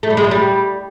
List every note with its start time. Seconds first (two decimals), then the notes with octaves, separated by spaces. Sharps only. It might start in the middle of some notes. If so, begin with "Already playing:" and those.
0.03 A3
0.10 G3
0.17 G#3
0.24 F#3
0.31 G3